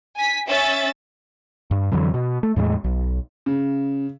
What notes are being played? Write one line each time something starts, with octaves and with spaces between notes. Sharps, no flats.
G#5 B6
C#4 E5 A6
G2
F2 D3 E3 F#3
B2
A3
E2 A2 F#3 G#3
B1
C#3